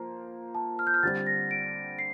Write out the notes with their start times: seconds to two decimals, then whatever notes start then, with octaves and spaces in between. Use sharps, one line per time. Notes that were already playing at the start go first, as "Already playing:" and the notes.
Already playing: F3 A#3 C5
0.55 A5
0.79 F6
0.87 G6
0.94 F6
1.03 D3 G3 C4 A6
1.27 A#6
1.51 D7
1.99 C7